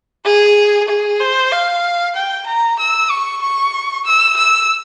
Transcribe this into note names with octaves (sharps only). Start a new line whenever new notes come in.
G#4
G#4
C5
F5
G5
A#5
E6
C#6
C#6
E6
E6